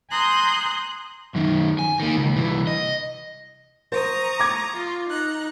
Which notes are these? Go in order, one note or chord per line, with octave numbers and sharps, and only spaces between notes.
G#5 A#5 C6 D#6 F#6 G6
F#2 D#3
G#5
D#3 A#3
C#2
C2 E3
D#5
C5 A#5 C#6 D#6
D6 G#6
F4
D#4 A#5 F#6